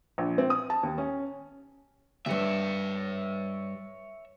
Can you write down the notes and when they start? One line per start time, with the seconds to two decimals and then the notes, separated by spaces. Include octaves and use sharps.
0.18 A#1
0.38 C4
0.50 D#6
0.70 A5
0.83 D#2
0.98 C#4
2.26 D2 G2 C#5 E5